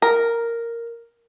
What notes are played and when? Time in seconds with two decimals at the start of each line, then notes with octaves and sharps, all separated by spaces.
0.02 A#4